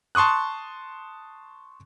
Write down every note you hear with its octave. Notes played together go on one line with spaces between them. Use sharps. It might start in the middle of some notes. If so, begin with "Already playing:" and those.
A5 C6 C#6 D#6 F#6